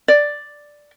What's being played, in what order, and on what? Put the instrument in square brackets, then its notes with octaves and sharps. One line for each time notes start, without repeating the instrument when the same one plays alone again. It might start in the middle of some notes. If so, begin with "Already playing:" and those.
[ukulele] D5